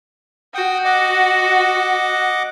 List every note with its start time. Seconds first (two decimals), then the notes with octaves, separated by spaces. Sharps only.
0.55 F#4 G5 D#6
0.85 D#5 F#5 D6